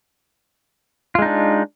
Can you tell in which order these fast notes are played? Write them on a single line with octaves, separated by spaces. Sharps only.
F4 G#3 D#4 D4